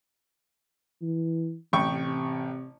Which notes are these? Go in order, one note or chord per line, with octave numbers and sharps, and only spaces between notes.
E3
A1 C3 G5 C#6